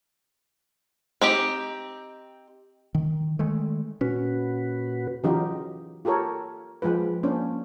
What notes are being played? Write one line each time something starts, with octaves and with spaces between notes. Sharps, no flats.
C4 D#4 G4
D#3
D#3 G#3 A3
A#2 C#4 F#4 B4
C#3 E3 F#3 D#4 F4 G4
F4 G4 A4 A#4 C#5
F3 G#3 F4 B4
A#3 C#4 D4 C5